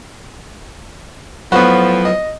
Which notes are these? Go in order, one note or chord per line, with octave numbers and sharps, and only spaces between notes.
A2 F3 F#3 B3 F#4 B4
D#5